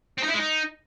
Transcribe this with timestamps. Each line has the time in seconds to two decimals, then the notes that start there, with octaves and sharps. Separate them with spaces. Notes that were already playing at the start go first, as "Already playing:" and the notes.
0.18 C4
0.23 D#4
0.28 E4
0.34 G#3
0.39 D#4